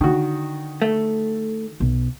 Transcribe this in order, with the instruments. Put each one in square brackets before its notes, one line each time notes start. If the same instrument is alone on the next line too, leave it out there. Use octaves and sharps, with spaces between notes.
[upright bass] D3 [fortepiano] D#3 F#4
[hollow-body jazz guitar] A3
[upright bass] B1